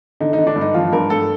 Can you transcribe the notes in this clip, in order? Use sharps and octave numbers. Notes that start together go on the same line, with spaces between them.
D3 D#4
D#4
D3
D4
G2
D#4
F3 F4
G2 A#4
G2 A4